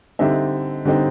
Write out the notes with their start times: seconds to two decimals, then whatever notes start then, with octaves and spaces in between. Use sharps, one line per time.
0.19 D3 G3 C4 D#4 E5
0.85 D3 G3 C4 D#4